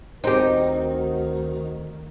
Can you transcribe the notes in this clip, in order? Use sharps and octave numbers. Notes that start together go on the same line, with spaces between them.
D2 D#3 C4 D#4 F#4 G4 A#4